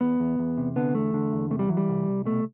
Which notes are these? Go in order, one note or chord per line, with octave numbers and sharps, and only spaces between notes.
E2 B3
E2
E2
C3
D3 B3
E2 A3
D3
E2
C3 A3
G3
E3 F#3
G3
C2
C2
B2 A3